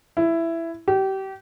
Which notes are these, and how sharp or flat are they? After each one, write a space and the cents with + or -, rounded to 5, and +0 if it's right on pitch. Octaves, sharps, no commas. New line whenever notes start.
E4 +10
G4 -30